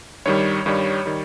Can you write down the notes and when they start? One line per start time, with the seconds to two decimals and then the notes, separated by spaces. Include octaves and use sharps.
0.26 G2 D#3 G3 C#5
0.66 G2 D#3 G3
1.06 D#3 G3